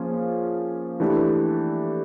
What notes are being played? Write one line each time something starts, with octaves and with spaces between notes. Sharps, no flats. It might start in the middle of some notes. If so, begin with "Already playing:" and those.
Already playing: F3 A#3 C#4 F4 G#4
E3 A3 D4 G4